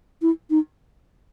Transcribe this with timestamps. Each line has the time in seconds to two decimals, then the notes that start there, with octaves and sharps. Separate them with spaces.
0.22 E4
0.50 D#4